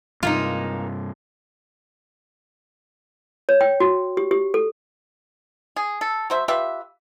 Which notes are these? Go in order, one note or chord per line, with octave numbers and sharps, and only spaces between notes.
G2 C3 G#3 A#3 D#4 F4
C#5
G5
F#4
G4
G4
A4
G#4
A4
F#3 C5 E5
F4 G4 B4 E5